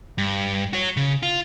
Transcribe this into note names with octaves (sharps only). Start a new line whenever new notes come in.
G2
F#4 C#5
C#3
F4